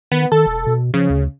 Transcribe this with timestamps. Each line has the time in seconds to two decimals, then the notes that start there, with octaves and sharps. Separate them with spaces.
0.12 D#3 B3
0.32 D#3 A4
0.46 E1
0.67 B2
0.94 C#3 F3
1.10 D2